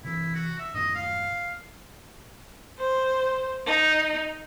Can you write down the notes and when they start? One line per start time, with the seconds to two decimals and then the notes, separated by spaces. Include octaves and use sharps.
0.04 C3 E3 E4
0.35 F#4
0.59 E5
0.74 F#2 A2 D#3 D#5
0.95 F5
2.78 C5
3.65 D#4